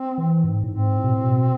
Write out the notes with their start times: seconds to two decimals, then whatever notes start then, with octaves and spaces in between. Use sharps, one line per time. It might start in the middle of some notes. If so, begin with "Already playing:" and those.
Already playing: C4
0.18 E3
0.44 G#2
0.64 A2
0.70 G#2 C4
0.97 A2
1.04 B2
1.11 A2
1.24 B2